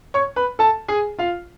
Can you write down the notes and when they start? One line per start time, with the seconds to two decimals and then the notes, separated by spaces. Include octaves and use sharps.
0.14 C#5 C#6
0.36 B4 B5
0.59 A4 A5
0.88 G#4 G#5
1.19 F4 F5